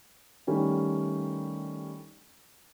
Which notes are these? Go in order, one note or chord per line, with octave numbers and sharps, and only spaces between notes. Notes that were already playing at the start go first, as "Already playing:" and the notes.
D#3 G3 A3 C#4